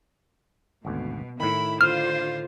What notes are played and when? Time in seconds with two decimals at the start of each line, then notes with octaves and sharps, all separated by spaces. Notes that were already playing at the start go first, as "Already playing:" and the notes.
0.85 G#1 D2 B2
1.40 A2 D#3 E4 B5
1.81 D3 F4 C5 F6